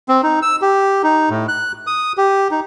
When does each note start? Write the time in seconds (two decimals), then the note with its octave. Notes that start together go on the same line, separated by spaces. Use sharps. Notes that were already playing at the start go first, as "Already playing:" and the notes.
0.09 C4
0.23 D#4
0.42 E6
0.62 G4
1.03 D#4
1.30 A2
1.48 F#6
1.87 D#6
2.18 G4
2.51 D#4